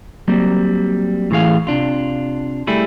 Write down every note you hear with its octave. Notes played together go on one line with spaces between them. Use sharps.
F#3 G3 A#3 C4
A2 E3 G#4 F5
C3 D4 F4
G3 A3 E4 G#4